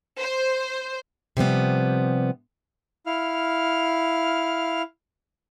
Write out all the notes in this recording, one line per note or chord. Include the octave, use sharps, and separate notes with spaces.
C5
C3 F3 G3 B3
E4 F5 F6